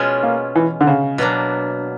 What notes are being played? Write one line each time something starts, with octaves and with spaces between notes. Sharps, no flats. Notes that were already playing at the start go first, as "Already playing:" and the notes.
Already playing: B2 G#3 C#4 F4
A#3
E3
D3
C#3
B2 F#3 A#3 D4